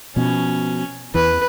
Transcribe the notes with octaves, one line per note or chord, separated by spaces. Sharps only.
B2 F3 C#4
E2 E3 B4